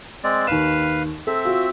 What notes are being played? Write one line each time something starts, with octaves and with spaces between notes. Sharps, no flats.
G#3 C4 D5
D#2 B4 F5 E7
C4 A4 E5
F4 F#4